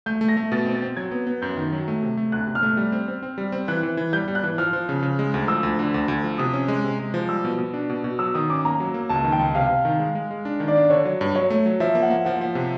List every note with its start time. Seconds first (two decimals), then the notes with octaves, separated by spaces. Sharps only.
0.06 A3 G6
0.21 A3
0.28 A#6
0.37 A3
0.52 B2 A6
0.66 C4
0.75 A6
0.82 C4
0.97 F#3 G#6
1.11 B3
1.27 B3
1.42 F#2 G6
1.57 D#3
1.73 F#3
1.88 A3
2.03 C3
2.17 A3
2.32 D2 F#6
2.47 C3
2.55 F6
2.62 A3
2.77 G3
2.92 C4
3.08 C4
3.23 C4
3.38 G3
3.52 C4
3.68 E3 F#6
3.83 E3
3.97 E3
4.13 G3 G6
4.28 G3
4.35 F#6
4.44 E3
4.58 F3 F6
4.73 F3
4.89 C#3
5.03 C#3
5.19 G#3
5.34 D2
5.48 F3 E6
5.63 D2
5.79 D3
5.94 D2
6.08 D2
6.24 F3
6.38 C3 D#6
6.53 C#4
6.68 G#3
6.84 C3
6.99 G#3
7.14 F3
7.29 G3 E6
7.44 B2
7.58 B2
7.74 D4
7.90 B2
8.04 B2
8.19 F#3 E6
8.35 D#3 D#6
8.50 C#4 D6
8.65 A#3 A#5
8.80 F#3
8.94 A#3
9.09 C#2 A5
9.24 D#3
9.32 G5
9.39 C#2
9.55 C3 F5
9.69 C3
9.85 D#3
9.99 G#3
10.15 G#3
10.31 G#3
10.45 D4
10.60 D#3
10.68 D5
10.76 D4
10.90 D3 C#5
11.05 F#3
11.21 G2
11.35 F#3 C#5
11.50 A3
11.66 F#3
11.80 F3 E5
11.95 A#3
12.03 F#5
12.10 A#3
12.25 F3 F#5
12.41 F3
12.55 C3